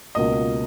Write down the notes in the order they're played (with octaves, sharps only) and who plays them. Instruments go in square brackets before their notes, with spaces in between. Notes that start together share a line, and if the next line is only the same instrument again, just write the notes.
[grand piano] C#2 B2 A#3 F4 A#4 [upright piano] D#5